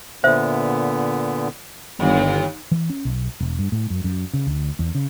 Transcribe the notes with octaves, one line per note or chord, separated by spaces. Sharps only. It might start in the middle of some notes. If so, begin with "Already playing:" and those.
A#2 D3 B3 C5 E5
G1 D#2
E3
C#4
B1
E1
G2
A2
F#2
F#2
C#3
D2
E2
C#3